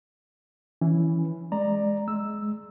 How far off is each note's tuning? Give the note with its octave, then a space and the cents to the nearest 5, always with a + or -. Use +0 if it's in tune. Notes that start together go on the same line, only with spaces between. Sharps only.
E3 +0 C#4 +0
G#3 +0 D5 +15 A#5 +0
G#3 +20 E6 +0